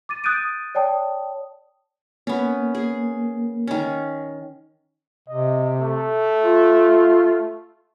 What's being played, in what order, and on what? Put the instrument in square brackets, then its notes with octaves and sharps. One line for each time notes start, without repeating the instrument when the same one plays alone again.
[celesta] D6 A6 D#7
D#6 F#6 G6 A6 D7 D#7
C#5 D5 G5 A5 D#6
[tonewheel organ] A#3 [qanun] B3 C#4
[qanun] G#4
D#3 C#4
[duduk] C3 [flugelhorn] D#5
[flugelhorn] A3
[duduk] F4